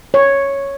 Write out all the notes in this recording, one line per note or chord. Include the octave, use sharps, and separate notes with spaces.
C#5